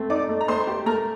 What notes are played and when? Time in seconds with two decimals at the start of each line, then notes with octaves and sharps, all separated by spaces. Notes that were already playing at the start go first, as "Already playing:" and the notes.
Already playing: A3 C4
0.10 D#4 D5 D6
0.29 A3
0.41 A#5
0.48 A3 C5 C6
0.67 G4
0.86 A3 A#4 A#5